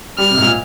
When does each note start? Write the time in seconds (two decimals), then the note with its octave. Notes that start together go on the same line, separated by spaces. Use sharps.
0.18 G3 F6
0.31 C3
0.37 G#2
0.42 A#2